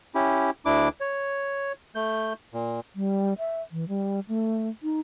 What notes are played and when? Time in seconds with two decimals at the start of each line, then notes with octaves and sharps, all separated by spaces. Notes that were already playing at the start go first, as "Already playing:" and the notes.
0.15 C#4 E4 G4
0.65 D2 D4 E4 D6
1.01 C#5
1.95 A3 G6
2.53 A#2
2.96 G3
3.38 E5
3.72 E3
3.88 G3
4.28 A3
4.83 D#4